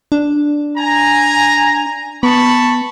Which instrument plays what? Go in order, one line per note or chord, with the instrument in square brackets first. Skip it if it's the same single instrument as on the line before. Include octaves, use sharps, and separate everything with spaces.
[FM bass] D4
[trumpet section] G#5 A#5
[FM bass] B3 [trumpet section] A5 B5 C#6